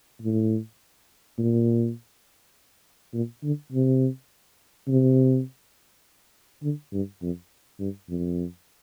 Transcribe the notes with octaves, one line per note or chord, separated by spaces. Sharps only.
A2
A#2
A#2
D3
C3
C3
D3
G2
F2
G2
F2